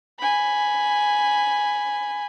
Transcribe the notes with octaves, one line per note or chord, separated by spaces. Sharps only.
G#5 B5